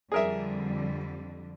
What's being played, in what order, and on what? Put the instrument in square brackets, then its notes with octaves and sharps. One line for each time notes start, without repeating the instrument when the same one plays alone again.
[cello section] F2 D3 G3 [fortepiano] G#4 A#4 E5